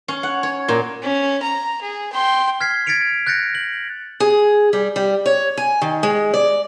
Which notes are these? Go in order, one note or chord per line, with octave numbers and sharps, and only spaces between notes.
C#4
F#5
C#5
A#2
C#4
A#5
G#4
G5 C6
F6 G#6 B6 C7
G#6 A6 B6 C#7 D7 F7
F#6 G6 A6 A#6 C#7
F#7
G#4
G3
G3
C#5
G#5
D#3
G#3
D5